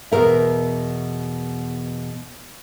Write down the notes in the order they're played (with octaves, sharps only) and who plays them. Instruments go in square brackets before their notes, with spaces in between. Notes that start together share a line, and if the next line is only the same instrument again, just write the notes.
[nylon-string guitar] E2 B2 A#4 E5